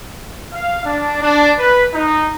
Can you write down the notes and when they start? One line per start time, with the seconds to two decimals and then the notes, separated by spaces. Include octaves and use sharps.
0.52 F5
0.83 D4
1.21 D4
1.58 B4
1.92 D#4